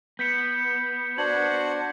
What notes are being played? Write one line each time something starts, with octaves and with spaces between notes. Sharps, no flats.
B3 G6 B6 C#7
D4 F#4 C5 F#5 G#6 F#7